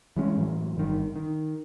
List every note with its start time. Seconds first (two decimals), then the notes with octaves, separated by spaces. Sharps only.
0.17 E3 G#3 C#4
0.37 A2 E3 F#3
0.76 G1 D#3
1.16 D#3